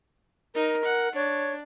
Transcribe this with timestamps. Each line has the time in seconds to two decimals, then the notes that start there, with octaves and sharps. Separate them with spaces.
0.55 D#4 A#4
0.85 F#5
1.15 D4 C#5